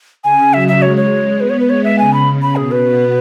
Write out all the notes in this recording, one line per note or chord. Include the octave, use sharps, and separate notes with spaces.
C#3 G#5
F#3 E5
E5
G#3 C#5
C#5
B3 B4
C#5
B4
G#3 C#5
E5
C#3 G#5
B5
B5
B2 G#4
B4
B3